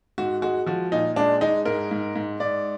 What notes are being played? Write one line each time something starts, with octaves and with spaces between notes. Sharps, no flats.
G#2 F#4
G#3 F#4
F3 F#4
A#2 D#4
G#3 D4
G#3 D#4
G#2 A#4
G#2
G#2
G#2 D5